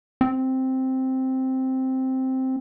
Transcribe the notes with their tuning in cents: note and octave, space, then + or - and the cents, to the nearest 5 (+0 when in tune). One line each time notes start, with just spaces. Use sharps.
C4 +0